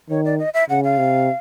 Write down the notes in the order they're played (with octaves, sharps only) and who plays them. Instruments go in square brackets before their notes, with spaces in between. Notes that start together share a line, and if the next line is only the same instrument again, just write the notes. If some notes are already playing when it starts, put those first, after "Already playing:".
[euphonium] D#3 [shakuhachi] C#5
[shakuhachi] D5
D#5
E5
[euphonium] C#3 [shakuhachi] F#5
[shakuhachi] F5
[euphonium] C3